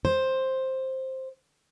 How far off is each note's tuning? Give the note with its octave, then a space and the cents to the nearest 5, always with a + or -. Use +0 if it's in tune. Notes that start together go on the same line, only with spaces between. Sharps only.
C5 +5